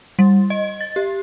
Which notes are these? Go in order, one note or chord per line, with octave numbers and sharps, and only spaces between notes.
G3
D#5
A6
G4